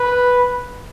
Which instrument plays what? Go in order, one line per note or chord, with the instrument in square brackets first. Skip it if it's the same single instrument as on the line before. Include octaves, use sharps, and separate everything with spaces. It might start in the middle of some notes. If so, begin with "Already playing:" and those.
Already playing: [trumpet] B4